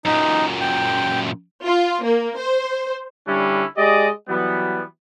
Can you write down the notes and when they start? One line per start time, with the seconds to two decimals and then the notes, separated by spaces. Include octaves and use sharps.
0.05 F#2 A#2 D#4
0.61 G5
1.64 F4
2.03 A#3
2.37 C5
3.27 D3 G3 C#4 D4 E4
3.77 G#3 G4 D5 D#5
4.29 E3 F#3 G3 B3